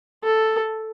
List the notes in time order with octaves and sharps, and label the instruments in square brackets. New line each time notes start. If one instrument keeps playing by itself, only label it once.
[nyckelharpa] A4